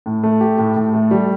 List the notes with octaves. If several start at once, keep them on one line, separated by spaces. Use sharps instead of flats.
A2
A3
G4
A2
A2
A3
G3